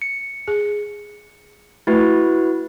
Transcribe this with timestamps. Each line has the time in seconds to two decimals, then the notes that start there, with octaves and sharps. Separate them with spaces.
0.02 C#7
0.48 G#4
1.87 A3 E4 F#4 B4